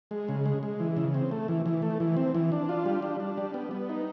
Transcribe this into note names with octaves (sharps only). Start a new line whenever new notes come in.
G#3
C#3
G#3
G#3
E3
C#3
C4
A3
E3
E3
A3
E3
C4
E3
D4
F4
G3
D4
D4
G3
B3
B3
D#4